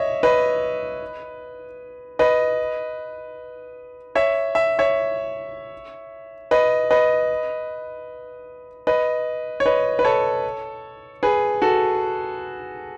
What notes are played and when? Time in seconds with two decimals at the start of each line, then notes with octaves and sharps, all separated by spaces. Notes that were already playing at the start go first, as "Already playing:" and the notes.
Already playing: C#5 D#5 E5
0.23 B4 D#5
2.19 B4 D#5
4.15 C#5 E5
4.55 E5
4.79 C#5 E5
6.51 B4 D#5
6.91 B4 D#5
8.87 B4 D#5
9.60 C#5
9.66 B4 D#5
9.99 B4
10.05 A4 C#5
11.23 G#4 B4
11.62 F#4 A4